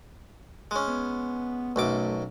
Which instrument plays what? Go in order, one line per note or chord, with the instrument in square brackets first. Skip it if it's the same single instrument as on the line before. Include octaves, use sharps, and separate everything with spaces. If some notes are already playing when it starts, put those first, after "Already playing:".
[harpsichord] G#3 C#4
[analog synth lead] B3
[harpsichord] B1 F#2 D6 [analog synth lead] A3